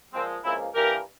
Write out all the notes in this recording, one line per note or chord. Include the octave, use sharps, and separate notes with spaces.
A#2 F3 G#3 C4
C#2 C#3 F3 A#3 C4 E4
G2 E3 G3 A#3 G4 A#4